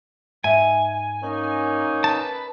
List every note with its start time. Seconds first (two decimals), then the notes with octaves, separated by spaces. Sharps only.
0.44 G#2 E5 G#5
1.23 A#3 C#4 D#4
2.04 B4 A5